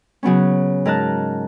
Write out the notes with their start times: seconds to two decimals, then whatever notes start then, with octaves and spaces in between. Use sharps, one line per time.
0.23 C#3 F#3 B3 C#4
0.85 G#2 A#4 A5 F#6